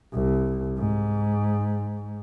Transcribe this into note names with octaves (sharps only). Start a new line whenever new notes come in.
C2
G#2